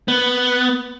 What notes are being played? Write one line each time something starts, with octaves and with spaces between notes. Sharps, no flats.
B3